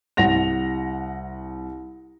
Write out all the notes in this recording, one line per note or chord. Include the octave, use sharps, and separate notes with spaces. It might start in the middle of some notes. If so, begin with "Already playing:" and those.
C2 F#5 A#6 F7